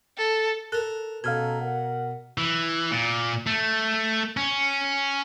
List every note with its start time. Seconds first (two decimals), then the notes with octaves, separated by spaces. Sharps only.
0.17 A4
0.72 A4 A#4 F#6
1.24 B2 C#4 A4 F5 A#5 F6 G#6
1.61 A#4 F#5
2.38 E3
2.91 A#2
3.47 A3
4.37 C#4